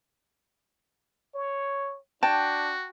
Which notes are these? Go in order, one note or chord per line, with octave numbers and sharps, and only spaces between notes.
C#5
D4 F#4 G5 A5